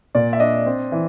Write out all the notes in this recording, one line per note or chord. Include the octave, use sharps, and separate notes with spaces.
A#2 D5
E5
D4 D#5
C4
E3